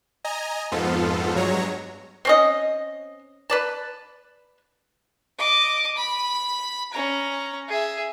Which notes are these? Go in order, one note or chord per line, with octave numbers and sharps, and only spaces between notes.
D#5 G#5 A#5
F2 G#2 F3 B3 F4 A4
G2 F#3 G#3 C#5 A#5
C4 C#4 D#5
B4 D5 A5
D#5 D6
B5
C#4 A#5
G#4 E5